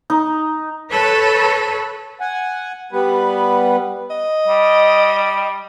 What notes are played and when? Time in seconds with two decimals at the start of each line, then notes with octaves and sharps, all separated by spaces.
0.10 D#4
0.91 A4 B4 C#5
2.20 F#5 G#5
2.92 G3 B3 B4
4.11 D#5
4.47 G3